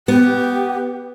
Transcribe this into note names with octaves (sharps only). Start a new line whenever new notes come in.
B3 G4